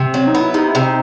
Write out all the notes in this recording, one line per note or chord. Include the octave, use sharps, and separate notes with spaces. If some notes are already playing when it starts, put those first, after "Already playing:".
Already playing: C3
F#3 C4
D#4
B3
E4
C3 D#4
E4
C3 C4
D#4